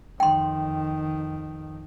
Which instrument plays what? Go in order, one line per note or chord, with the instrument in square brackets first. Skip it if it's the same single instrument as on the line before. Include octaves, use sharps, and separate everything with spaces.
[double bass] F2 D#3 [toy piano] G5 C6